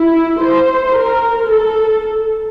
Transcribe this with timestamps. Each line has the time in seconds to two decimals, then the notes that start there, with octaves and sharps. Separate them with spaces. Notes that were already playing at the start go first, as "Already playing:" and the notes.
Already playing: E4
0.42 C5
0.96 A#4
1.48 A4